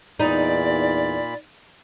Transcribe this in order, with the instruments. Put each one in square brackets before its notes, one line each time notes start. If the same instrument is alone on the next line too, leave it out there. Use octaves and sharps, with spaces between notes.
[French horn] E2 [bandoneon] A#2 B5 [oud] D#4 [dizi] D5